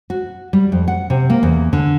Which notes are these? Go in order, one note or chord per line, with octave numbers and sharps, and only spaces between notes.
F#4
G3
F2
F#5
C3
A#3
E2
D3